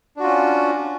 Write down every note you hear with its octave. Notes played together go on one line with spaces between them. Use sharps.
C#4 D4 F4 F#4